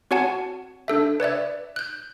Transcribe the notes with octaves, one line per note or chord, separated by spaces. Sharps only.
C4 F#4 C#5 F#5 G#5 A5
D4 A4 E5
B4 C#5 D5 E5
F#6 G6